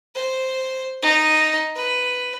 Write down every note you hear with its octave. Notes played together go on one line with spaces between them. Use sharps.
C5
D#4
B4